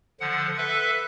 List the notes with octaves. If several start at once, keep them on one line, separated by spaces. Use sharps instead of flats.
D3 F3 F#5
A4 B4 E5